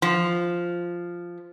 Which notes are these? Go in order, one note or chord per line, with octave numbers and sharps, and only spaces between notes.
F3